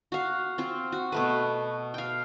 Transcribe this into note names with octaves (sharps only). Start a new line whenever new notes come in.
F#4 F5
C4 F4
F#4
B2 A3 B4
F5 G5